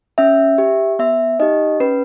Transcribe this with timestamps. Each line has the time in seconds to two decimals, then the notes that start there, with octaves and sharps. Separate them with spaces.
0.18 C#4 E5
0.58 G4
0.99 B3 E5
1.40 D#4 G4 D#5
1.80 C#4 B4